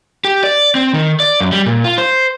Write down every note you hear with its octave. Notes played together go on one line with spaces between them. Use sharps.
G4
D5
C4
D#3
D5
F#2
G3
A#2
F4
C5